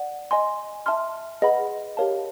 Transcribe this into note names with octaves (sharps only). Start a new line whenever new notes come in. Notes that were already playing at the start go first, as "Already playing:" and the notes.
Already playing: D5 F#5
D#5 G#5 C6
E5 A5 C6 F6
G#4 B4 D#5 F#5 B5
G4 A#4 C#5 F5 A5